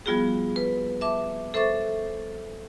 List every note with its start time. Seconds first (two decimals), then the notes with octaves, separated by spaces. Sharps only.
0.06 F3 G3 B3 F4 F#4 G#4
0.56 B4
1.01 E5 A5 D6
1.54 A4 C5 E5 C#6 D6 A6